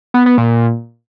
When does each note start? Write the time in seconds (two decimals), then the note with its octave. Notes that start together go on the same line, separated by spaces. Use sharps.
0.14 B3
0.26 B3
0.38 A#2